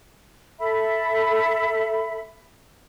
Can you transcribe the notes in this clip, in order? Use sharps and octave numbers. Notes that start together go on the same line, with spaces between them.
A4 E5 B5